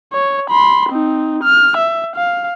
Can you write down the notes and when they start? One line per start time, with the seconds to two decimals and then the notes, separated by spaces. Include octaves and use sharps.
0.13 C#5
0.50 B5 C6
0.90 C4 D#4
1.44 F6
1.77 E5
2.16 F5